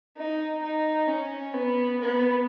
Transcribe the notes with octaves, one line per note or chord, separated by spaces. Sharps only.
D#4
D#4
C#4
B3
B3